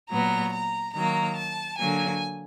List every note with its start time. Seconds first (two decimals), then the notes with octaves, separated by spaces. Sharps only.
0.11 A#2 F#3 B3 A#5
0.53 A#5
0.95 D#3 F#3 A#3 A#5
1.37 A5
1.79 D3 F#3 A#3 G#5